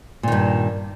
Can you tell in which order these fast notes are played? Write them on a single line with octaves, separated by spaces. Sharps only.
A#2 D#3 G2